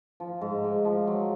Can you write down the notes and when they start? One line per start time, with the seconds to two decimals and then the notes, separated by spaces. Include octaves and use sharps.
0.20 F3
0.41 G#2
0.64 G#2
0.85 F3
1.07 F#3